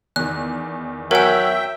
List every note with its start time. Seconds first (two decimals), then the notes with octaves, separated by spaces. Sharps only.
0.16 E2 D#3 F#6
1.11 F#3 A#4 E5 G5 G#5